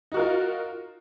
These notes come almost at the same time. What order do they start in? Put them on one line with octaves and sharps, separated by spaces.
D#4 F#4 A#4 F4